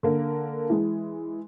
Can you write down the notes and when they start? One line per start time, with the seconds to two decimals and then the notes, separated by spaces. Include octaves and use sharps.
0.03 D3 A#3
0.70 E3 G#3